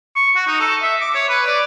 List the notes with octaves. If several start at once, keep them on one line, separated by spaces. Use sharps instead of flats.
C#6
F#4
D#4
A4
E5
D6
C#5
B4
D5